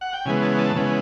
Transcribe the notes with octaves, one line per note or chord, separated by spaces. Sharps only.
F#5
G5
C#3 E3 G#3 B3 G#5
A5
A5
C#3 E3 G#3 B3